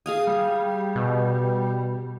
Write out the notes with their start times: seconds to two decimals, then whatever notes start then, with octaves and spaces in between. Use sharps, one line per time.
0.06 G#4 F5 G#5 D#6
0.27 G3
0.96 B2